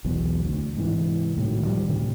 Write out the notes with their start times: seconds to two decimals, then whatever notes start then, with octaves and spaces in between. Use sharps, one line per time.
0.05 B1 E2
0.45 D2
0.77 G#2 C3 E3
1.36 C#2 A2 D#3 F#3
1.65 D#3 F3 G3
1.87 D2 A2 C3